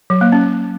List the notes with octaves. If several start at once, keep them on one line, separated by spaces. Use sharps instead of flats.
F#3
A#3
C#4